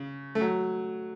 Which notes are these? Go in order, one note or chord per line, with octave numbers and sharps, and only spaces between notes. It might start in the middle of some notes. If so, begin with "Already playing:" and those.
Already playing: C#3
A3
F#3